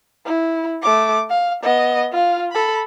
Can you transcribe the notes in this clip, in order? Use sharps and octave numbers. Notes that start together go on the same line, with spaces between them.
E4
A3 D6
F5
B3 D#5
F4 F5
A4 B5